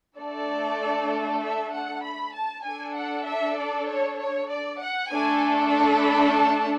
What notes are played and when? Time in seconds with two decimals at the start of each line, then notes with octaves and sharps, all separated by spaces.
0.18 A3 D4 A4 D5
1.41 E5
1.72 F#5
2.03 B5
2.34 A5
2.65 D4 A4 G#5
2.96 F#5
3.26 E5
3.58 D5
3.89 C#5
4.19 C#5
4.49 D5
4.81 F#5
5.11 A3 D4 A4 G#5
5.73 A5
6.03 B5
6.35 A5